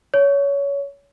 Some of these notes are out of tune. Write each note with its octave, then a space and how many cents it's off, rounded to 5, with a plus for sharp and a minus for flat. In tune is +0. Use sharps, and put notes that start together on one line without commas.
C#5 +20